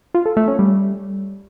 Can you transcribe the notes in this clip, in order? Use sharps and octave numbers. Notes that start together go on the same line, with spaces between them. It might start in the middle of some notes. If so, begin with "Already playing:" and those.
F4
A4
A3
C#4
G3